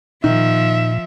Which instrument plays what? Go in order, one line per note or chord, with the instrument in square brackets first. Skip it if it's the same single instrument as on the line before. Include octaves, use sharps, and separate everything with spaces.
[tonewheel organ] A#2 [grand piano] D#3 [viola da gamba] F3 [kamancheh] E5